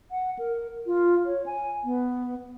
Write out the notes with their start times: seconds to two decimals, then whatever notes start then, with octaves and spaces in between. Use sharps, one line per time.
0.11 F#5
0.39 A#4
0.87 F4
1.26 C#5
1.46 G#5
1.84 B3